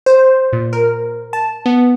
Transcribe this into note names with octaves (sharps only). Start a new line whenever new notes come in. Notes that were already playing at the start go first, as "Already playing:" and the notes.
C5
A#2
A#4
A5
B3